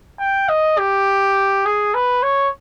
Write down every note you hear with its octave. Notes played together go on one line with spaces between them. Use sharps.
G5
D#5
G4
G#4
B4
C#5